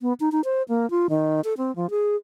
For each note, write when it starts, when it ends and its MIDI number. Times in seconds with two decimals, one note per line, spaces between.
0.01 0.13 59
0.20 0.29 63
0.32 0.41 63
0.45 0.63 72
0.69 0.89 58
0.90 1.07 65
1.10 1.41 51
1.44 1.54 69
1.58 1.74 60
1.76 1.90 53
1.90 2.16 68